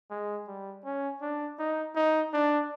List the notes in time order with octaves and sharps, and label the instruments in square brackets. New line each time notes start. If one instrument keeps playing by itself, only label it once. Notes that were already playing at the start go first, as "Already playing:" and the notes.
[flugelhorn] G#3
G3
C#4
D4
D#4
D#4
D4